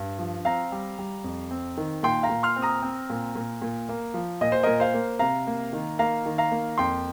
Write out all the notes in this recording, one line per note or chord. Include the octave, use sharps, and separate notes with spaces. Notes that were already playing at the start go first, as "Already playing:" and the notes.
Already playing: G2
F3
C4 F5 A#5
G3
G3
F2
C4
D#3
A#2 G5 C6
F5 A#5
A#2
C6 F6
C4
A#5 D#6
C4
A#2
A#2
A#2
A#3
F3
A#2 D#5
C5
A#2 A#4 D#5
C5 F5
A#3
C3 F5 A#5
A#3
D#3
A#3 F5 A#5
D#3
F5 A#5
A#3
F2 G5 C6